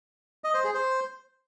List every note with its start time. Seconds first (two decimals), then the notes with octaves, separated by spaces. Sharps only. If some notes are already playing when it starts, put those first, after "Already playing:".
0.44 D#5
0.54 C5
0.64 G#4
0.74 C5